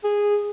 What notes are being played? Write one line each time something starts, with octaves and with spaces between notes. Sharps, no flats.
G#4